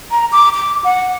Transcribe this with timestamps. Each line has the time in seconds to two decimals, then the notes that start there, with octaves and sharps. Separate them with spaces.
0.11 A#5
0.32 D6
0.54 D6
0.84 F#5